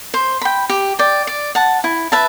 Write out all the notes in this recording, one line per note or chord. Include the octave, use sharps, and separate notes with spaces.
C5
G5 B5
G4
D5 G5
D5
F#5 A5
E4
B4 E5 A5